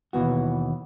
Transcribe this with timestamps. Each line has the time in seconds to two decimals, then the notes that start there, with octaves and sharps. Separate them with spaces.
0.13 D#2 B2 E3 B3 F#4